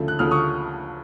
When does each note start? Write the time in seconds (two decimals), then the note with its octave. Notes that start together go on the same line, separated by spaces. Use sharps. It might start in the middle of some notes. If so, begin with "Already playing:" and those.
Already playing: D2 C#3 F3 A3
0.08 F#6
0.19 D2 C#3 F3 A3 D#6 F6
0.31 C#6 D#6